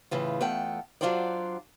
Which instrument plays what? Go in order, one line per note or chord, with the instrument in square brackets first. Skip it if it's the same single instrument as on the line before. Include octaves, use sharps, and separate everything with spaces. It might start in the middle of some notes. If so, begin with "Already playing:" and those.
[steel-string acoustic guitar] A2 C#3 E3 F4
E2 A3 F4 A4 F#5 G5
F#3 D4 F4 F#4 C5 D5